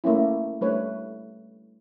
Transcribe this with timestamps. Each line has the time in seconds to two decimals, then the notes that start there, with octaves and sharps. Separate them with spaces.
0.04 A3 A#3 C#4 E4
0.61 G3 A3 D4 B4 C#5